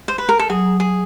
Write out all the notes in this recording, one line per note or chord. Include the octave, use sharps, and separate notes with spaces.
C5
B4
A#4
A4
F#3 G#4
G#4